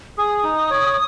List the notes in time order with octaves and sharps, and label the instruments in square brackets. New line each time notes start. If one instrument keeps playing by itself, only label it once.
[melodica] G#4 [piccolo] D#6
[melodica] D#4
C#5